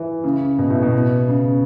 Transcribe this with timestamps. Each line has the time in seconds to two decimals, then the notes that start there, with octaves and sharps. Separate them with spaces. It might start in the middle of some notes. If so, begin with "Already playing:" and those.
Already playing: E3
0.24 C#3
0.59 B2
0.70 A2
0.82 B2
1.28 C#3